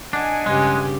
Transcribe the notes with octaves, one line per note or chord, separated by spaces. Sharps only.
D4 D#5 F#5 G#5
G2 C#3 G#3 G4